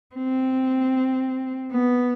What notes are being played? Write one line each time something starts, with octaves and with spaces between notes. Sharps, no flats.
C4
B3